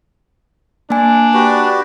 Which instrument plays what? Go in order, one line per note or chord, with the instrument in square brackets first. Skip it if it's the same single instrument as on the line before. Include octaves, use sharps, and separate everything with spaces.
[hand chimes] A#3 G#5 [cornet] D4
[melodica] F#4 G4 B4